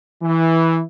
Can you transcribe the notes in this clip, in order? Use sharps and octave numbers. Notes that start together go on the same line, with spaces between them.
E3